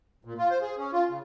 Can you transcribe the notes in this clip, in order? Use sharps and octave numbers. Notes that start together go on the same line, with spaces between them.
A#2
F4
C5
G#4
C#4
F4
C#3